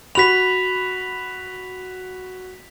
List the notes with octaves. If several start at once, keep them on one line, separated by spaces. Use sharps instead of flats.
F#4 B5 B6 F7